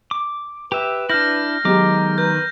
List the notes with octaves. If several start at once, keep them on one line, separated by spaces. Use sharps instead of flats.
D6
G4 B4 E5
D4 E4 F6 G6 A#6
D#3 F#3 G#3 B3 G4 A#5 D6
B4 G6